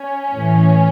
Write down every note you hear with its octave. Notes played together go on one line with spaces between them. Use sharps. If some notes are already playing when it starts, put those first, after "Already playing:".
Already playing: C#4
A2 E3